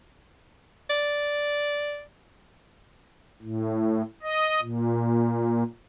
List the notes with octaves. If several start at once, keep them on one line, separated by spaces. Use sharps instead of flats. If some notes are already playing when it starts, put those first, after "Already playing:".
D5
A2
D#5
A#2